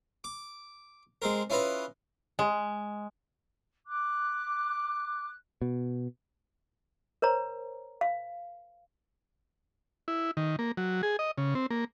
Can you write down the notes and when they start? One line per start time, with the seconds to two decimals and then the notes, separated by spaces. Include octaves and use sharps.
0.24 D6
1.22 G#3 C4 A#4
1.50 C#4 E4 F4 B4 D#5
2.39 G#3
3.87 D6 F#6
5.62 B2
7.22 A#4 C5 C#5 A#5
8.01 F5
10.08 E4
10.37 D#3
10.59 A#3
10.77 F#3
11.03 G#4
11.19 D#5
11.38 C#3
11.55 C4
11.70 A#3